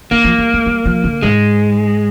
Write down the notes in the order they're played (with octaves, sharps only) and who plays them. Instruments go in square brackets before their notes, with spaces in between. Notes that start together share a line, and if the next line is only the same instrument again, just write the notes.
[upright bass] D#3 [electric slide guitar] A#3
[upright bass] F3
G3
G#3
G3
F3
D3
[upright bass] G#2 [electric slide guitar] G#3